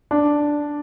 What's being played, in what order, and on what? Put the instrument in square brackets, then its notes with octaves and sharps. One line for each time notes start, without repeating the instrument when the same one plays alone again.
[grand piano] D4